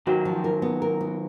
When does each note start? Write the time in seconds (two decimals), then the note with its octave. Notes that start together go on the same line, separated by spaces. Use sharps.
0.07 D#3 F#3 F#4
0.25 F3
0.44 A#4
0.62 B3
0.82 A#4
1.01 B3